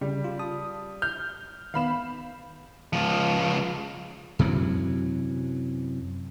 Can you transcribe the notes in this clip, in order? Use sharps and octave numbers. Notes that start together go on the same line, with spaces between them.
C#3 G3
F4
A5 D#6
F6 G6
D#3 B3 F5 B5 E7
C#2 F3
F#2 C3 E3 F#3